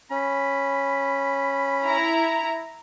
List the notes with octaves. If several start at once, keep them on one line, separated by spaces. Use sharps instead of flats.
C#4 B5
E4 A#5